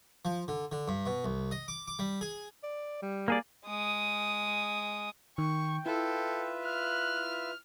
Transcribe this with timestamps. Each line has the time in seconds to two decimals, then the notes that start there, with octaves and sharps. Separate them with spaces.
0.25 F3
0.48 D3
0.72 D3
0.88 G2
1.06 B2
1.24 C2
1.51 D#5
1.68 D6
1.87 D6
1.99 G3
2.21 G#4
2.63 D5
3.02 G3
3.28 A#3 G#4 D5
3.67 G#3 D#6
5.38 D#3 G5 C#6
5.86 E4 F4 A4 B4 E5
6.66 F6 F#6